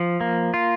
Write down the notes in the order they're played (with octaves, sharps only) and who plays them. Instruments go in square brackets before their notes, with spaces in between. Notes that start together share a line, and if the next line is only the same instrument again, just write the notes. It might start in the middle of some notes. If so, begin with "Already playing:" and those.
Already playing: [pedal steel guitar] F3
A#3
F4